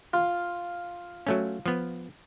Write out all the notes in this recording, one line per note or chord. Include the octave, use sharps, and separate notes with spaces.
F4
F#3 A3 C#4
F3 B3